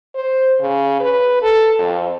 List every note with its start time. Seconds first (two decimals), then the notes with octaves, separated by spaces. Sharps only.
0.15 C5
0.60 C#3
1.00 B4
1.42 A4
1.79 F2